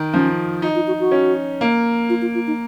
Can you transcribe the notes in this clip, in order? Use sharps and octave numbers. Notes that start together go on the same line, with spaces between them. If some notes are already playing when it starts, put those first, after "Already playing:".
Already playing: D#3
F3 C#4
D#4 F4
F4
F#4
F#4
C#4
A#3
F4
F4
F4
D#4